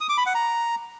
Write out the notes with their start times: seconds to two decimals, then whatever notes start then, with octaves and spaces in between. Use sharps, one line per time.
0.01 D#6
0.09 D6
0.18 B5
0.26 F#5
0.35 A#5